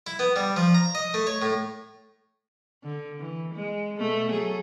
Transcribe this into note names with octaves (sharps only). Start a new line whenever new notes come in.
E4
B3
G3
F3
A#5
D#5
A3
C#5
A2
D3
E3
G#3
B2 A3
F#3 G#4 A4